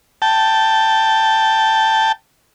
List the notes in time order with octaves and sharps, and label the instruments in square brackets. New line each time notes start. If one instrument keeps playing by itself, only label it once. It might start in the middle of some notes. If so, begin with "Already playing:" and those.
[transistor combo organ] G5 A5